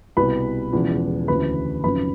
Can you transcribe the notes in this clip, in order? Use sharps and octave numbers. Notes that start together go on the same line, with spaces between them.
C2 B2 B4 B5
E1 E2 C#3 F3
D2 C#3 E3 B4 B5
G#1 F#2 C#3 F3 B4 B5